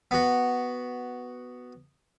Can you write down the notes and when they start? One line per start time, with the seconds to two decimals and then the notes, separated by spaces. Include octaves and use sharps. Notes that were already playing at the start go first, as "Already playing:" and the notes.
0.11 B3 F#4